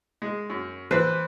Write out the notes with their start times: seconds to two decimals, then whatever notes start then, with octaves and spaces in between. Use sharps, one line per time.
0.22 G#3
0.50 F#2
0.91 E3 B4 C5